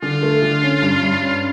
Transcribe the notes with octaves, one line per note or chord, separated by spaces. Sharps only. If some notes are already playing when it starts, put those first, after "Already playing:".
D3 F4
A3
D3
C#4
G2
G2
C#4